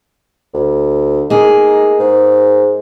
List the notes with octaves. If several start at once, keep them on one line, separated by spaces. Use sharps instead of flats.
D2
A#3 D#4 G#4
G#2